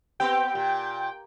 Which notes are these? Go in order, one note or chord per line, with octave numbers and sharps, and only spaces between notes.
B3 C4 G4 G5
A#2